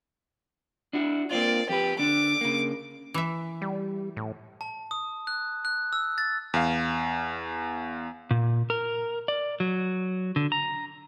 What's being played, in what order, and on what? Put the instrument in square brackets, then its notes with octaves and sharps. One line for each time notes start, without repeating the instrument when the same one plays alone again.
[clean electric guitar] D4 E4 F#4
[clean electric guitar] A#3 C4 F4 [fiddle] D5
[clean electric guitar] F2 B4 [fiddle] G4
[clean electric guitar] D3 D4 [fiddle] D6
[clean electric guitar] C#3 A#3
[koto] E3 E5
[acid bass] G3
A2
[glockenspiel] A5
D#6
F#6
F#6
E6
A6
[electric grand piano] E2 F5
[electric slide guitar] A#2
A#4
D5
F#3
D3
A#5